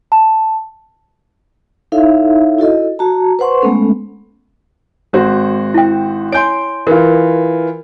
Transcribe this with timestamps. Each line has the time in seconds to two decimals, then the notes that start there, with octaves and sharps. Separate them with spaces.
0.12 A5
1.92 D#4 E4 A4 C#5 E5 F5
2.59 E4 F#4 A4 D#5
2.99 F#4 A5 A#5
3.39 B4 C5 F#5 C6 C#6
3.62 G#3 A3 B3 C#4 A4
5.13 G#1 F#4 C5
5.74 E4 G5
6.32 C#5 G#5 C6 G6 D7
6.87 E3 F4 A#4